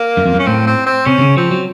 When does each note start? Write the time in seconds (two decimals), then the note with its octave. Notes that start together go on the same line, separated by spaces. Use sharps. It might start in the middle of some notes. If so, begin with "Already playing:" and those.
Already playing: A#3
0.17 F#2
0.26 F2
0.34 F#2 C#4
0.47 A2 C4
0.67 C4
0.86 C4
1.06 C3 C#4
1.18 C3
1.21 C#3
1.37 F3 C4
1.51 F#3